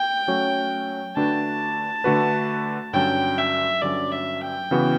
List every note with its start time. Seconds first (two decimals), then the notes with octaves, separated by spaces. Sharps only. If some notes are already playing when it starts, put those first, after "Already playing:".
Already playing: G5
0.28 F#3 A3 C#4 F#4 C#5
1.16 D3 A3 D4 F#4 B4 A5
2.04 D3 A3 D4 F#4 B4
2.93 G2 D3 F#3 C#4 G5
3.38 E5
3.82 G2 D3 F#3 C#4 D5
4.12 E5
4.41 G5
4.71 C#3 E3 B3 F#4